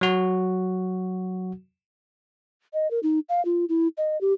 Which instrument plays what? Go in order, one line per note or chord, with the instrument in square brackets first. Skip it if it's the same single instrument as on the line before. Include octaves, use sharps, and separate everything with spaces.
[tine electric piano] F#3 F#4
[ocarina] D#5
A#4
D#4
F5
F4
E4
D#5
G4